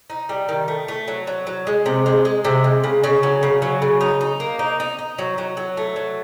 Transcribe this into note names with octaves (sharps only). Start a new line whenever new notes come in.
D#4
G3
D#3
A3
A3
F#3
F#3
F#3
G#3
C3
G#3
G#3
C3
G#3
C#3
C#3
F#3
C#3
F#3
C#3
D#4
D#4
A#3
D#4
D#4
D#4
F#3
F#3
F#3
A3
F#3